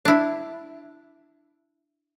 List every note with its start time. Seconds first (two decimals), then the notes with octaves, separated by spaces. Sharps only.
0.05 D4 E4